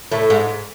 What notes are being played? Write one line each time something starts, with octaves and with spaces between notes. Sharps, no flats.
A2 A3
G#2 G#3